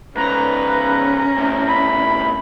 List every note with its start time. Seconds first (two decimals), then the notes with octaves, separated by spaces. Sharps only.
0.17 G#2 C#3 C#4 B4 A#5
1.37 A2 C3
1.69 B5